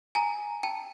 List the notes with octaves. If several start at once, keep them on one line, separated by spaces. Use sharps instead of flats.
G#5 A#5
G5 A5